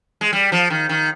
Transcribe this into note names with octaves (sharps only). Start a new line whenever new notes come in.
G#3
G3
F3
D#3
D#3